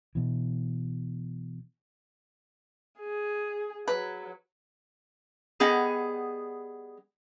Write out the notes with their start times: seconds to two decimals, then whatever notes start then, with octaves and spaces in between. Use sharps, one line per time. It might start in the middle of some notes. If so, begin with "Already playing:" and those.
0.15 B2 E3
3.00 G#4
3.88 F#3 B4
5.60 G3 B3 G#4 D#5 F#5